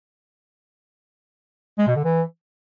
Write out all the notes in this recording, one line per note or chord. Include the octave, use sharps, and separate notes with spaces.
G#3
B2
D3
E3